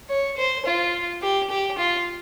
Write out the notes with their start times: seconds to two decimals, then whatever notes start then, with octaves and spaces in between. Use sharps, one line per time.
0.09 C#5
0.37 C5
0.66 F4
1.22 G4
1.50 G4
1.79 F4